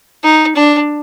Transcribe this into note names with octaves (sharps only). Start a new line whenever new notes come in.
D#4
D4